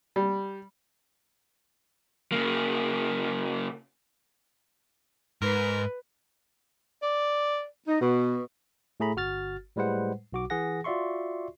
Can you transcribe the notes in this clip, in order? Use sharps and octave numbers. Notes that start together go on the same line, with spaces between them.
G3
C#3 A#3
G#2 A#4 B4
D5
D#4
B2
A2 A3 G#4 A#5 B5
G1 F#4 F6 A6
A2 G3 G#3 B4 C5 F#5
B1 F#4 D6
E3 G#4 F#5 A#6
F4 F#4 D5 E5 C6 C#6